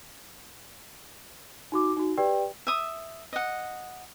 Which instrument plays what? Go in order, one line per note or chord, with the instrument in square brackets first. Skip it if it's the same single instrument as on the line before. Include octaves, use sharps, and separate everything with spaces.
[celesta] D#4 F#4 D6
D#4 F#4
G4 B4 D5 G5
[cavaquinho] E5 D#6
D#5 F#5